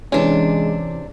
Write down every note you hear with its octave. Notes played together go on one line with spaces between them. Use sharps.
C3 E3 G#3 C#4 D4